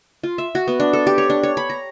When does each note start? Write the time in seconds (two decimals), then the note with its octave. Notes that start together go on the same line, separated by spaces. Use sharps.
0.24 F4
0.38 E5
0.55 F#4
0.68 B3
0.80 D4
0.93 A4
1.07 G4
1.18 C#5
1.30 D4
1.43 C#5
1.57 B5
1.70 A#5